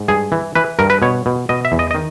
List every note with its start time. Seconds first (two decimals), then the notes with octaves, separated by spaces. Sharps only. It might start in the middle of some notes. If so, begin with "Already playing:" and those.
Already playing: G#2
0.08 G2 G#4
0.32 E3
0.55 E3 B4
0.79 G2 A#4
0.90 B4
1.02 B2 C#5
1.26 B2
1.49 B2 D#5
1.65 E5
1.72 E2
1.79 D#5
1.91 D#5
1.95 D#3